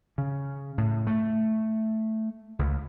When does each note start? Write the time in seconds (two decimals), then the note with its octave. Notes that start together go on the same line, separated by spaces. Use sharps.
0.18 C#3
0.78 A2
1.07 A3
2.59 C#2